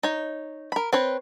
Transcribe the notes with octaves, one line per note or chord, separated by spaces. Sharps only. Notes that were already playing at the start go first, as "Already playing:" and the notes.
D#4 C#5
A#4 B5
C4 B4 C#5